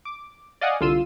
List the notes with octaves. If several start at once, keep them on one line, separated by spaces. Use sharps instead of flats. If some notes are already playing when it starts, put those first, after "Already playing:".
D6
D5 D#5 F5 F#5 G#5 D#6
C2 D3 F4 C6 E6 D#7